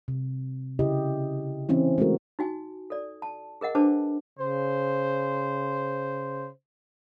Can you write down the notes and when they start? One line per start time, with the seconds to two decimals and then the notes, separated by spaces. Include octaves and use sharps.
0.08 C3
0.79 C#3 E4 G4 D#5
1.69 E3 C4 C#4 E4
1.98 G#3 A3 C#4 F#4 A4 A#4
2.39 D#4 F#4 G#5
2.90 A4 D5
3.22 A5
3.61 G#4 A#4 D#5 F#5
3.75 D4 G#4 B4 C5 A5 D6
4.38 C#3 C5